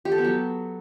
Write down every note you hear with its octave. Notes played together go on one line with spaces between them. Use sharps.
G4
A4
B3
F#3